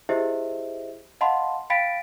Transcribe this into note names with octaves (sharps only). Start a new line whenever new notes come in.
E4 G4 G#4 C5 D#5 E5
D#5 F5 F#5 A5 B5 C6
F5 G5 B5 A6 B6 D7